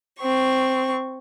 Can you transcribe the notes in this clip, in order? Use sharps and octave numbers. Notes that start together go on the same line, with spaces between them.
C4 C#6